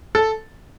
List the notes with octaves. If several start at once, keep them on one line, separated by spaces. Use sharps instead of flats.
A4